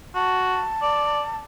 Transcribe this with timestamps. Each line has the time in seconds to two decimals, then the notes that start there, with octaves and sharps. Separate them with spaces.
0.15 F#4 A5
0.82 D5